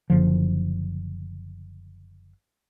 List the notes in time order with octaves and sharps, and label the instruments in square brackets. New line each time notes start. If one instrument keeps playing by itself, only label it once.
[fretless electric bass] F#1 D3 F3